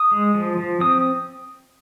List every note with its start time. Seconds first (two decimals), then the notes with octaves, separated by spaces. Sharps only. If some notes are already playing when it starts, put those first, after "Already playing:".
Already playing: D#6
0.11 G#3
0.34 F3
0.58 F3
0.80 C4 D#6